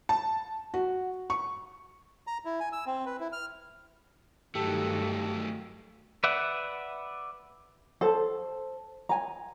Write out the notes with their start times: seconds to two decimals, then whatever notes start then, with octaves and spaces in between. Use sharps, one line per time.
0.09 A5
0.74 F#4
1.30 C#6
2.27 A#5
2.45 E4
2.60 G#5
2.72 E6
2.86 C4
3.06 B4
3.20 E4
3.32 F6
4.55 G2 D#3 F#3 A3 G4 A4
6.24 B4 D5 E5 F#5
8.01 A4 C5
9.09 G#5 A#5